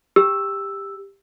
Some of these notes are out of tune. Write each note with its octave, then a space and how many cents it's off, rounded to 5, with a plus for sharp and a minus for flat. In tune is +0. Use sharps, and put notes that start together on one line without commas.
G4 +15 E6 +0